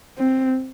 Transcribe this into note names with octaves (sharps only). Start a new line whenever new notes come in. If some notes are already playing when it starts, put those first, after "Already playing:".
C4